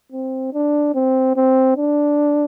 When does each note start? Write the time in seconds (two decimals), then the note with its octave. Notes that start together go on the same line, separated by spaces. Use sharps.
0.12 C4
0.53 D4
0.95 C4
1.36 C4
1.77 D4